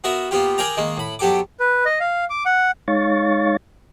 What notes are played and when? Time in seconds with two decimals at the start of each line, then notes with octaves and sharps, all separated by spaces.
0.04 B3 F#4 A#4 E5
0.31 A#3 B3 F4 G4
0.58 G#4 A#4 D5 G5 A#5
0.77 D#3 G#3 A#3
0.97 A2 B5
1.19 F#3 B3 G4 A4 D6
1.60 B4
1.85 D#5
2.00 F5
2.30 D6
2.46 F#5
2.88 G#3 D#4 C#5 F5 C#6 A6